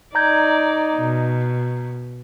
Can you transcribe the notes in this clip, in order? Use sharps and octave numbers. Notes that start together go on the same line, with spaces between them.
D#4 D5 A#5 G6 G#6
B2